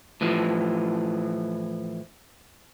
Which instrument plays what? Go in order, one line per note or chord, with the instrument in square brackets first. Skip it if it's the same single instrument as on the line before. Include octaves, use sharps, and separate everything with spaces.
[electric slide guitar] A2 E3 F3